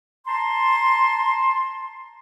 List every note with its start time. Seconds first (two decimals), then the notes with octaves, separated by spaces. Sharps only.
0.27 A5 A#5 C6